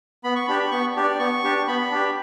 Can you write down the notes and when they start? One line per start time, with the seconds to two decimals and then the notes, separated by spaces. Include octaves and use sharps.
0.24 B3 B5
0.36 C#6
0.47 D4 G4 B5
0.59 B5
0.71 B3 C#6
0.96 D4 G4
1.03 D5
1.19 B3 C#6
1.44 D4 G4
1.68 B3 B5
1.91 D4 G4